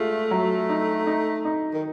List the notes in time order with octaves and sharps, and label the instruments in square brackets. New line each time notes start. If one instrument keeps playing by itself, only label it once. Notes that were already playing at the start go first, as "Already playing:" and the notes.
Already playing: [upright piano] G#3 F4 [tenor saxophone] A3
[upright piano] F#3
D#4
D#4
D#4
[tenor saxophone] D#3